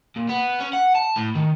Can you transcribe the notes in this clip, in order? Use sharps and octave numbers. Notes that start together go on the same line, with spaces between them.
A#2
B3
C#4
F#5
A5
A2
D#3